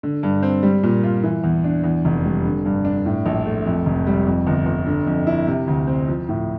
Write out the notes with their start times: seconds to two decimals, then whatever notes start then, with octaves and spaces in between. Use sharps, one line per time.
0.03 D3
0.23 G2
0.43 C4
0.63 G3
0.83 A#2
1.04 F4
1.24 E3
1.44 E2
1.64 D4
1.84 E2
2.05 F1
2.25 G3
2.45 D3
2.66 G2
2.85 D4
3.06 A2
3.26 A#1
3.46 A3
3.66 F2
3.86 F1
4.07 G3
4.27 F2
4.47 G1
4.66 G1
4.86 D3
5.07 F2
5.27 E4
5.47 C3
5.67 D2
5.87 C4
6.08 F3
6.29 A2